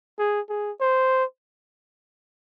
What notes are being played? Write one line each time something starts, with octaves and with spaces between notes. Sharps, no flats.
G#4
G#4
C5